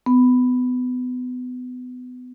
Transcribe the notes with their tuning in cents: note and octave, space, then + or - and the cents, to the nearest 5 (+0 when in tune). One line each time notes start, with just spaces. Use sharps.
B3 +25